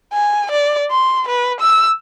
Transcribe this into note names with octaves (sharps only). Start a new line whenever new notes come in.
G#5
D5
C6
B4
E6